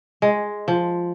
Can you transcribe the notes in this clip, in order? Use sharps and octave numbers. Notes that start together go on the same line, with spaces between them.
G#3
F3